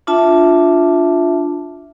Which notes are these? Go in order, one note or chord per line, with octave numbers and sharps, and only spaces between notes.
D4 F4 E5 A5